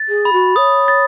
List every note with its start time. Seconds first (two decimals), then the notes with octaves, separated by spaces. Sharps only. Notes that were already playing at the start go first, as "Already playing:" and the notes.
Already playing: A6
0.09 G#4
0.25 B5
0.33 F#4
0.56 C#5 D#6
0.88 A6